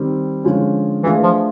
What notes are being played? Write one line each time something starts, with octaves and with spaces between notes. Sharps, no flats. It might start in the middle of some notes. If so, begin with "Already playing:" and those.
Already playing: D#3 G3 C4
D3 F3 G#3 C#4
E3 A3 D4 F4 G#4 B4
F3